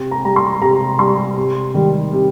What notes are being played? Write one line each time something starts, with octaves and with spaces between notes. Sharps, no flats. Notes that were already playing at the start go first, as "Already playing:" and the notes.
Already playing: C3
A#5
G3 A#5
C6
C3 A#5
G3 C6
C3
D#3 G3
C3